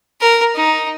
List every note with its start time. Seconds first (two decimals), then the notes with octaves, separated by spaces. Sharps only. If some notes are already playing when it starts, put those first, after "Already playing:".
0.21 A#4
0.55 D#4